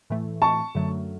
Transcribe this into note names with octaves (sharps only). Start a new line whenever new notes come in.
A2 E3 A3
A5 C#6
F#2 D3 F#3 A3